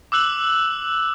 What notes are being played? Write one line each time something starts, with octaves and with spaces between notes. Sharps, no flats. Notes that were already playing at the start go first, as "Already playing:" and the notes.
D6 E6 F#6 F#7